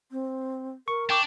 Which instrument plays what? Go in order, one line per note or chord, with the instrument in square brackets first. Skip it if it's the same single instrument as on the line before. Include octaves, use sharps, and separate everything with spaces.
[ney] C4
[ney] A#4 [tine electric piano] C#6
[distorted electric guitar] D4 [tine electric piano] G5 C#6 D6